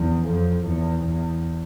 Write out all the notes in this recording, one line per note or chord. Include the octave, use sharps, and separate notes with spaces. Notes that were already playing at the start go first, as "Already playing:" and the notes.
Already playing: E2
F2
E2
E2